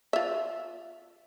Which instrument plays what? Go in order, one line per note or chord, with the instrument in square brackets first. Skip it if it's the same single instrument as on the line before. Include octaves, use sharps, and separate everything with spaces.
[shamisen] F4 E5